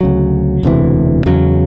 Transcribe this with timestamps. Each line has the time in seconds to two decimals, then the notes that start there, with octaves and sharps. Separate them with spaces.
0.01 D2 C#3 F#3
0.63 E1 D2 C3 E3
1.26 E2 C#3 F#3